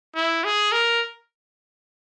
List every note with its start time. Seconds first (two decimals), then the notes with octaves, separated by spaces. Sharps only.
0.15 E4
0.44 G#4
0.72 A#4